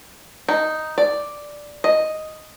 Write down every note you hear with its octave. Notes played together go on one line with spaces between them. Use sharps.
D#4
D5
D#5